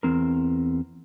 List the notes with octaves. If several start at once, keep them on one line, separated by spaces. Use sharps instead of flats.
E2 C4 A#4